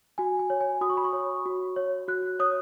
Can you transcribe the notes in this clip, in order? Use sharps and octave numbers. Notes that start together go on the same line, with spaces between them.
F#4 G#5
G#5
C#5
G#5
F#4 D#6
C#6
B5
C#6
C#5
F#4
C#5
F#4 F#6
C#5 D#6